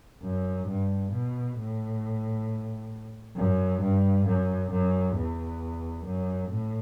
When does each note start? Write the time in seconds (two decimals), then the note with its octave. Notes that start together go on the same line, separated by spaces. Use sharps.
0.23 F#2
0.68 G2
1.12 B2
1.58 A2
3.36 F#2
3.81 G2
4.27 F#2
4.71 F#2
5.16 E2
6.05 F#2
6.51 A2